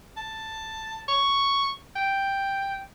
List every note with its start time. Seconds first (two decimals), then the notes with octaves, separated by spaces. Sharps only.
0.17 A5
1.08 C#6
1.96 G5